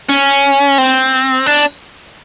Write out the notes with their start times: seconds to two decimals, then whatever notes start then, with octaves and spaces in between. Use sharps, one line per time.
0.09 C#4
0.78 C4
1.46 D4